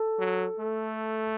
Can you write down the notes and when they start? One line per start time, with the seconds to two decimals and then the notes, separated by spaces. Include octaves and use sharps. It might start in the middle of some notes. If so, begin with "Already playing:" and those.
Already playing: A4
0.19 F#3
0.59 A3